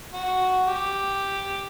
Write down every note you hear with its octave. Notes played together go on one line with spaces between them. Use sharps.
F#4
G4